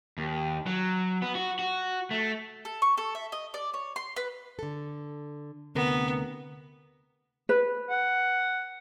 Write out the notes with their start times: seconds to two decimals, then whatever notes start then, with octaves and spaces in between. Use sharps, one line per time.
0.18 D#2
0.66 F#3
1.22 B3
1.35 F#4
1.59 F#4
2.11 A3
2.65 A4
2.82 C#6
2.97 A4
3.15 E5
3.32 D#5
3.54 D5
3.74 C#5
3.96 C6
4.16 B4
4.59 D3 A4
5.75 D2 C3 B3 A#4
7.49 B4
7.90 F#5